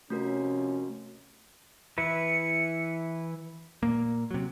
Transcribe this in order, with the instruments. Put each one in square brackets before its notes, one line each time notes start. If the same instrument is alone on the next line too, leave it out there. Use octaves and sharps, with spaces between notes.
[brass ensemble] C3 F3 C#4 [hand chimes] A3 F#4 A#4
[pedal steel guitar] E3 E4 B4 [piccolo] C#7
[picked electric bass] A#2 A#3
C3 F#3